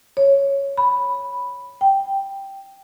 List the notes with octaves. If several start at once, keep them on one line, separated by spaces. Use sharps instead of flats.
C#5
B5
G5